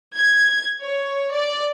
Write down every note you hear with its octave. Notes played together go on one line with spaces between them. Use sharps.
G#6
C#5
D5